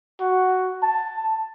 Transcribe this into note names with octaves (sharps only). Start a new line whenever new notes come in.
F#4
A5